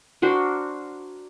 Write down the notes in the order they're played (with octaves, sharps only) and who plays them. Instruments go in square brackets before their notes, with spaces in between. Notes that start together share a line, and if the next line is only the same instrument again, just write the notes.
[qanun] D4 F#4 A#4 C5